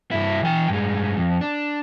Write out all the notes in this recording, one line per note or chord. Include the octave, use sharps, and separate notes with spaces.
G2 E4
E3 G5
G2 G#3
F2
D4